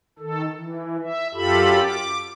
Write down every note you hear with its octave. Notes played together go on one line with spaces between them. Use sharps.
D#3 A4
E3
E5
F#2 F4 G4 A4 B5
D6